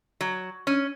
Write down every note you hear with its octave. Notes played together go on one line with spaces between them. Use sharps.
F#3
C#4